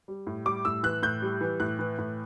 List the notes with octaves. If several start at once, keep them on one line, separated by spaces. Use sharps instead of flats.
G3
A2
G3 D6
A2 E6
E3 F#6
A2 G6
G3
E3
A2 F#6
E3
A2